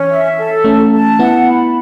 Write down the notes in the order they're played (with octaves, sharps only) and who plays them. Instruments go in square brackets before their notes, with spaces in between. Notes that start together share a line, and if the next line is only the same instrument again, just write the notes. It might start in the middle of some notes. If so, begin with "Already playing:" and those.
Already playing: [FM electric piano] E3 [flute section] C#4
[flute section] E5
A4
[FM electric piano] A3 C#4 [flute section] A5
[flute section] A5
[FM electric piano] B3 E4 [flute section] F#5
[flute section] B5